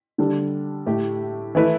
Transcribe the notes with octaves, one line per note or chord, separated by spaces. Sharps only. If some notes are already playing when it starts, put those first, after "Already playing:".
D3 G3 D4 A4
A2 A3 G4
E3 A3 E4 B4